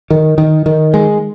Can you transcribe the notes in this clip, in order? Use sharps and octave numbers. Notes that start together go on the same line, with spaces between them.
D#3
D#3
D#3
G#3